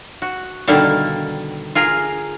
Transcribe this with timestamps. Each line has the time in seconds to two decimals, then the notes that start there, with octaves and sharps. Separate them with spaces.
0.22 F#4
0.67 B2 D3 D#3 G3 A#3 A4
1.75 F4 G#4 A#4